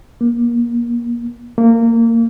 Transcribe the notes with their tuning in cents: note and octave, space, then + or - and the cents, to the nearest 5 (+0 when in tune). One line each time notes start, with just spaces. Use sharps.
A#3 +25
A#3 -25